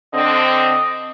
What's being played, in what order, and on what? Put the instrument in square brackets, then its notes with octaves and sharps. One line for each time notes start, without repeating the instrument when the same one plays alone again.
[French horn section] D3 C4 [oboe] D#5